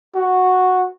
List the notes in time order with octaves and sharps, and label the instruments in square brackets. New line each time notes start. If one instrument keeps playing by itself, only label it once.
[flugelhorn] F#4